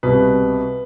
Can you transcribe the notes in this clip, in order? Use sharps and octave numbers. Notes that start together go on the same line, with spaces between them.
C2 B2 B4